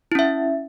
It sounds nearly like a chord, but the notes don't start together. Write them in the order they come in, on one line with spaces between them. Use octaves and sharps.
E4 C#4 E5